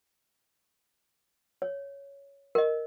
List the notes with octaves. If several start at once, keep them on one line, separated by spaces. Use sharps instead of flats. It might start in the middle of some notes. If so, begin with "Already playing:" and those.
C#5
A#4 D#5